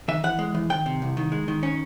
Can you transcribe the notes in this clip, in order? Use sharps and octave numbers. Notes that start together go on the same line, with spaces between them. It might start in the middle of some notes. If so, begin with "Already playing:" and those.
D#3 E5
E3 F#5
G#3
E3
D#3 G5
C3
C2
D#3
G#3
D#3
C#4